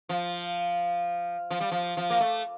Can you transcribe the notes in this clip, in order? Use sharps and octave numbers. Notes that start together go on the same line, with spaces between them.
F3
F3
G3
F3
F3
A#3
A3